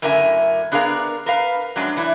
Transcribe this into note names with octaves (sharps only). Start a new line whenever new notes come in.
F#2 A2 D3 A#4 E5 G#5
B3 D4 G#4 A#4 F5
A#4 B4 F5
F#2 F#3 G#3 D4
E3 D4 E4